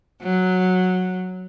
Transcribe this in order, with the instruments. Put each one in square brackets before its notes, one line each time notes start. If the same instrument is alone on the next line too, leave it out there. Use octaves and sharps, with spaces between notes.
[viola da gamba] F#3